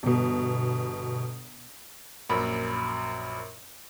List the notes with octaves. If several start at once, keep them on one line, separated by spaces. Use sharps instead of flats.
G1 B2
A#1 F#2 A#4 B5